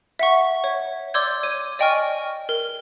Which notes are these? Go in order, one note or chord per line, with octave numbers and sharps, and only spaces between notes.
E5 F#5 C#6
C#5
D5 C6 D6 E6 G6 G#6
C#5 D#7
D5 D#5 G5 G#5 C#6 F6
A#4